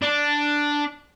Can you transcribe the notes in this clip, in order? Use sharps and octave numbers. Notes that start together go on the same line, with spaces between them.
D4